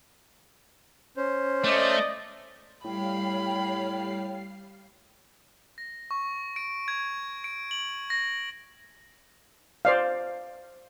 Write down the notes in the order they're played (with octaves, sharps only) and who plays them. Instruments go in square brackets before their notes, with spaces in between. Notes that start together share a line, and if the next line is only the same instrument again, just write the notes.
[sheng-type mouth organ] C#4 C5
[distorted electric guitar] A3 [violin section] D5 D#5
[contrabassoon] A2 [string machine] G3 F5 C7 [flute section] C#5 G5 [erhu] B5
[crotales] A#6
C#6
D7
G#6
D7
F#7
A#6
[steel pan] C5 D5 F5